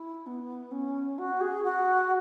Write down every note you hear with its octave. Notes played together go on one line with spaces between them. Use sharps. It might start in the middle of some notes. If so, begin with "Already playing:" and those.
Already playing: E4
B3
C#4
F#4
G#4
F#4